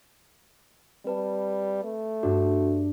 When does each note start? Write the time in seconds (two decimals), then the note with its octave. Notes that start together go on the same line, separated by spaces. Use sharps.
1.05 G3 C4 B4 A5
1.84 A3
2.23 G2 D4 F#4